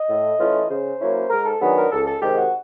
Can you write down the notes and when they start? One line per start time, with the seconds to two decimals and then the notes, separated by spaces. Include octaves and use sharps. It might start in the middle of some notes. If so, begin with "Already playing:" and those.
Already playing: D#5
0.08 A2
0.39 E3 A3 C#4 F4
0.69 C#3 C5
1.00 F#3 A#3 C#4 E4
1.30 G#2 A#4
1.45 A4
1.61 D#3 F#3 B3 D4 G#4
1.76 A#4
1.91 C#2 A4
2.06 A4
2.21 C3 D#3 G#3 G4
2.37 F#4